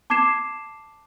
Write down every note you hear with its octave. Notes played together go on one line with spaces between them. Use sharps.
A5 D6 G#6 C7 E7